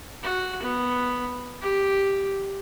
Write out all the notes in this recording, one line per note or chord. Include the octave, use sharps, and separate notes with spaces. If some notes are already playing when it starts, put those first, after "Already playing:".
F#4
B3
G4